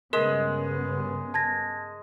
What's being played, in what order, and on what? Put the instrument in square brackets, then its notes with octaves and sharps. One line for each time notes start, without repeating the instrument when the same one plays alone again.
[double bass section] G2 C#3 B3 [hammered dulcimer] G#3 [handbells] A#4
[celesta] A5 G#6 A#6